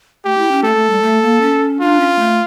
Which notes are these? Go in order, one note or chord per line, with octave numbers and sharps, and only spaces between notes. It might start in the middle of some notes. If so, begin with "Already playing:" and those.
A3 G4
E4
C#4
A3 A4
A3
G3
A3
A#3
C#4
D4 F4
C#4
A3